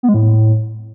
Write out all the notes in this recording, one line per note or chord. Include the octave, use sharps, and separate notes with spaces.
B3
G#3
A2